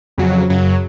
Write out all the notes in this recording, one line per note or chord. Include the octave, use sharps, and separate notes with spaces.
F2 C#3 F#3
F#2 C#3 F#3